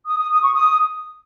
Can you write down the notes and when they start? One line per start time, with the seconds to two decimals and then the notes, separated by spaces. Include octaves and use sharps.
0.07 D#6
0.19 D#6
0.30 D#6
0.42 C#6
0.53 D#6